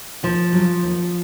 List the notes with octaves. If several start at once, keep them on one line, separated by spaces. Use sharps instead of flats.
D#2 F3
C#3 F#3
D#2